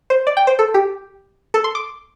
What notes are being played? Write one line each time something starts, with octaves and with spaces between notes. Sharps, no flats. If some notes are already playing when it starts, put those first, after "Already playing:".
C5
D5
G5
C5
A4
G4
A4
C6
D6